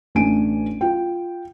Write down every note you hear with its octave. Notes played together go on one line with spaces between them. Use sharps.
A1 A3 D4 G#5 D7 D#7
F4 G5